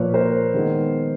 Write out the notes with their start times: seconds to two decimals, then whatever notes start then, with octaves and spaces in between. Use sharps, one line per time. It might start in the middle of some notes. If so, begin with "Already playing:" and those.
Already playing: A#2 F3 A#3 B4 C#5
0.14 A#4 C5
0.54 D#3 G#3 B3